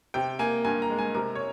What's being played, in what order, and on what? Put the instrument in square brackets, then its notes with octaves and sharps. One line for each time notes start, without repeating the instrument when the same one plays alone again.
[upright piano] C3 G5
A#3 G#5
G2 G#5
A#5
G#3
G#5
C3 A#4
C#5